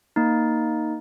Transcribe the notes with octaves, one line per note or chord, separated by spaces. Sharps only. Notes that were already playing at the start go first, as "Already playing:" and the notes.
A#3 D#4